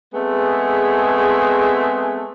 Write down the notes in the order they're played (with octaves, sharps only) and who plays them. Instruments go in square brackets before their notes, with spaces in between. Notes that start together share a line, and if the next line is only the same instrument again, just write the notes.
[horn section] G#3 A3 B3 C4 G#4